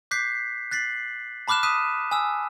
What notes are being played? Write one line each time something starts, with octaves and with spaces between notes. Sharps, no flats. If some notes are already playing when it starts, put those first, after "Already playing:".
D6 F#6 G6 B6 C7
F#6 A6 B6 C7 F#7
A5 B5 D6 F6 F#6 E7
D#6 F#6 B6 D#7 E7
G#5 D#6 E6